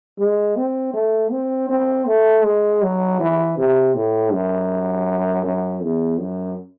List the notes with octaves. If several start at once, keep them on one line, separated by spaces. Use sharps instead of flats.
G#3
C4
A3
C4
C4
A3
G#3
F#3
E3
C3
A2
F#2
F#2
E2
F#2